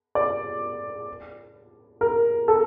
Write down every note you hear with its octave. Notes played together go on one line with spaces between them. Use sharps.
D5
A#4
A4